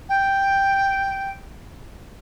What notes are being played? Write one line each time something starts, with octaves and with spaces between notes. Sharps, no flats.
G5